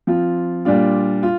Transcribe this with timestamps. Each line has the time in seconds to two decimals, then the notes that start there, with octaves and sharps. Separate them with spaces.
0.07 F3 C4 F4
0.65 A#2 G3 D4 F4
1.23 F4